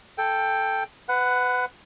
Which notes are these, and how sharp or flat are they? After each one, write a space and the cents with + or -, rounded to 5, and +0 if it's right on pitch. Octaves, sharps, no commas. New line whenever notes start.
A4 +0 G5 +10
B4 +25 F#5 +0